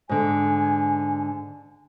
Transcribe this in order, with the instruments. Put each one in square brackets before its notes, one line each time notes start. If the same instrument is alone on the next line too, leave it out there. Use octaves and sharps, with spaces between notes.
[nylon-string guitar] G#2 D3 [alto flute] G#5